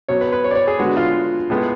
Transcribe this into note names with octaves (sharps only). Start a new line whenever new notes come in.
B2 F#3 B3 C#5
B4
B4
C#5
D5
C#5
G#4
D3 G#3 B3 F#4
F4
A2 G#3 B3